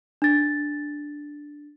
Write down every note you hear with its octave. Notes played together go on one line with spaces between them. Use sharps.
D4 A6